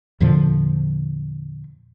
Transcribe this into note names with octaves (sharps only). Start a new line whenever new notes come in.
E2 A#2 D3 F3